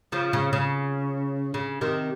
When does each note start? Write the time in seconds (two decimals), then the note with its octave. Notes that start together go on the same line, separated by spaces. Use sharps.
0.12 C#3 F3
0.33 C#3
0.53 C#3
1.54 C#3
1.81 C3 D#3